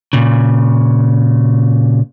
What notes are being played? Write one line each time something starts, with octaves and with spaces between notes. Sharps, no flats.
A#2 C#3